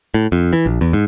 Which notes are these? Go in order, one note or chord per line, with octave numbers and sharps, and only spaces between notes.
A2
F2
E3
A#1
E2
G#2